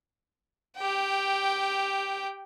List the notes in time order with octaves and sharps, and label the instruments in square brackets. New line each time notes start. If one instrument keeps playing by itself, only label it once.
[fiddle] G4 G5